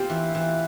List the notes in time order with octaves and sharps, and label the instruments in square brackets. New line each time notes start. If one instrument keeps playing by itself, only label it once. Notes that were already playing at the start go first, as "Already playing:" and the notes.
Already playing: [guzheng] C4 [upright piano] F4 G4
[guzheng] E3
E3